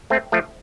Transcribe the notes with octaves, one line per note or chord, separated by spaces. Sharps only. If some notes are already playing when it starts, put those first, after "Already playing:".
A3 C4
F3 A3